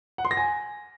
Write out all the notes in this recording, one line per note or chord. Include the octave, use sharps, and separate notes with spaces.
F#5
C6
A#6
G#5